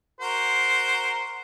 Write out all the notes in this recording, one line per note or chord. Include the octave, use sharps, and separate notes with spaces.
F#4 A#4 C5